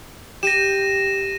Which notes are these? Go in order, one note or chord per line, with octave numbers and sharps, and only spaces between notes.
G4 A#6 D#7 E7